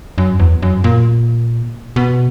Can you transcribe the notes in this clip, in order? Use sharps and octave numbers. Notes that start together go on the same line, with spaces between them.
F#2
E2
F#2
A#2
B2